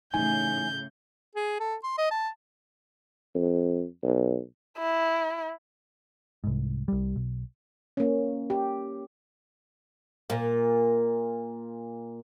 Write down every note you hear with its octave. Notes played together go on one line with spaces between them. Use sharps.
A2 C#3 E3 D#4 G#5 G6
G#4
A4
C6
D#5
A5
F2
B1
E4
C2 G#2
C2 G3
B1
A#3 C#4
G4
A#2 A#3